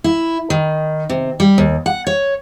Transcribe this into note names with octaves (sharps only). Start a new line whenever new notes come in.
E4
D#3
C3
G3
D#2
F#5
C#5